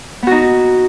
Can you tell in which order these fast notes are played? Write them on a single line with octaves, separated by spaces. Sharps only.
B3 F#4 D#4